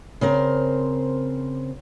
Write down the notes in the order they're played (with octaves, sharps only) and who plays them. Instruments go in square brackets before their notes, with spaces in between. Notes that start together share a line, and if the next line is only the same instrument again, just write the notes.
[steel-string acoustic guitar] C#3 C4 A#4 C5